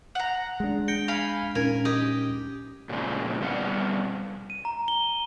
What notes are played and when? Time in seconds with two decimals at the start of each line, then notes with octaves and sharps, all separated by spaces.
0.15 F#5 A#5
0.60 G#3 D4
0.88 G5 A#6 C#7
1.08 F5 G#5 B5
1.55 A#2 C#4 D#4 A#4 G#5
1.85 G4 D#5
2.89 A#2 C#3 F3 G#3 C4
3.41 B2 G3 F5 F#5
4.50 D#7
4.65 A#5
4.88 G7